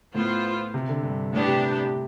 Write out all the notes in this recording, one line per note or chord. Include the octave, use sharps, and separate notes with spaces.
A2 B3 F4 C5
C3
D3
G2
A2 B3 D4 G4
C3